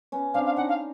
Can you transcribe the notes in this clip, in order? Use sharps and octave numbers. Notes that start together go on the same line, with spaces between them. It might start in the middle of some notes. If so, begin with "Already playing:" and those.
B3 C#4
C4 D4 F5
F5
C#4 D#4 F#5
F5